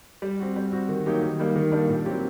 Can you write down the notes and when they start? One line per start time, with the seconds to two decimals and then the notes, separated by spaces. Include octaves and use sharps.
0.22 G3
0.40 C4 F#4
0.56 G3
0.73 C4 F#4
0.89 D#3
1.06 F#3 A#3 D#4 G4
1.22 D#3
1.39 G3 A#3 D#4
1.56 D#3
1.72 G3 A#3 D4
1.89 A#2
2.06 F#3 C4 G4